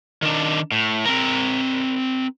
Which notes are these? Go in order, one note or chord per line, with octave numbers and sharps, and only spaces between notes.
D#3 D4
A2
C4 A#4